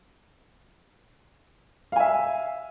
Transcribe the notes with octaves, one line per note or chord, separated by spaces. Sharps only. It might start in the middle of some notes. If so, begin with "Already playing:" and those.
E5 F5 G#5